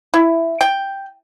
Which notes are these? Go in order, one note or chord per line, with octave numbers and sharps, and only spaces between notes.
E4
G5